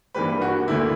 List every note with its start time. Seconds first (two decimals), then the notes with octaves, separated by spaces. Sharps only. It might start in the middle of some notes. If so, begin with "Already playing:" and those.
0.14 G2 E3 G3 A#3 B4
0.41 F#4
0.68 D2 D3 A#3 E4